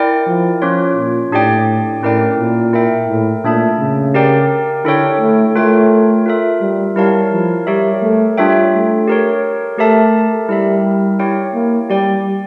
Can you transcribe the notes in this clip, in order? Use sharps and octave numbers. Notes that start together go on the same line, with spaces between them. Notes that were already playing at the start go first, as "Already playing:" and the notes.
Already playing: E4 A#4 D5 G5
F3
F3 C#4 F4 C#5
A#2
A2 D4 G4 D5 G5
A2 C#4 E4 A#4 D5 G5
A#2
E4 A#4 E5 G5
A2
A#2 A3 D4 A4 E5 A5
C#3
G4 A#4 D5 G5
D3 E4 A4 C#5 G5
A3
A3 F4 A#4 C#5 G5
F4 A#4 E5
G3
G3 E4 A#4 C#5 F5 A5
F3
G3 G4 A#4 C#5 E5
A3
G3 D4 F4 C#5 E5 G5
A3
G4 A#4 C#5
A3 G4 A#4 E5 A5
G3 E4 A#4 E5
E4 G4 C#5 G5
A#3
G3 G4 D5 G5